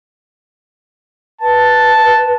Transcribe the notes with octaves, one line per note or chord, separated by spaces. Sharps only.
B4 A5